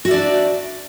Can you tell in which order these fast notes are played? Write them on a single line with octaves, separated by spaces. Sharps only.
F#4 E5 D5 D4